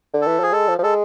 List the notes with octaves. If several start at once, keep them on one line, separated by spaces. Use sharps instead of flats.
D3
A4
E3
F3 G#4
G#3 A4
F3
F3
G#3 A4